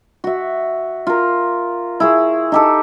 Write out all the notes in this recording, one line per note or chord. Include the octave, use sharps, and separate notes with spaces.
F#4 E5
F4 A#4
E4 G#4 C#6
D#4 G4 A4